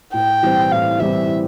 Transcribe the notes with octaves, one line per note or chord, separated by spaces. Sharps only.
A2 G5
E3 G3 C4
A2 F5
E3 G3 C4 E5